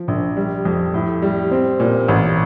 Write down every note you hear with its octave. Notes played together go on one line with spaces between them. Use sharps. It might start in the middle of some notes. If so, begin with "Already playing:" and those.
Already playing: F3
A#1
G3
F2
A2
G3
C4
A#2
A1